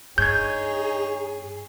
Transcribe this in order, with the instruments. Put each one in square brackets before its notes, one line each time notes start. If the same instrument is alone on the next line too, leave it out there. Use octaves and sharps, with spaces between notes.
[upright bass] G2 [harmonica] D#4 C#5 [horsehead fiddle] G#4 [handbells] G6 G#6